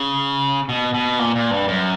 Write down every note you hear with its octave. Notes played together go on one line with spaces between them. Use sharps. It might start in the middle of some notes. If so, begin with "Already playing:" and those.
Already playing: C#3
B2
B2
A#2
A#2
G2
F#2